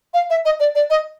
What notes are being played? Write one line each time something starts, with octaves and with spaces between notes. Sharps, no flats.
F5
E5
D#5
D5
D5
D#5